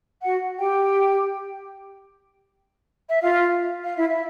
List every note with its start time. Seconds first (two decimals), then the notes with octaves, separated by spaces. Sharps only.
0.23 F#4 F#5
0.60 G4 G5
3.10 E5
3.21 F4 F5
3.85 F5
3.96 E4 E5
4.10 E5